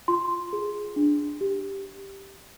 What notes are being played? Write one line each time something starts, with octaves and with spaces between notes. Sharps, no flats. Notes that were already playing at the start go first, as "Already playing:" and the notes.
F4 C6
G#4
D4
G4